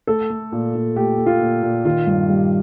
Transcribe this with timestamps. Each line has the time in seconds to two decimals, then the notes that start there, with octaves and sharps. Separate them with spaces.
0.07 A3 A4
0.30 A3
0.52 A#2
0.75 A#2
0.96 A3 G4
1.18 A3
1.26 F4
1.41 A#2
1.63 A#2
1.85 D#3 F4
2.07 G2
2.29 G3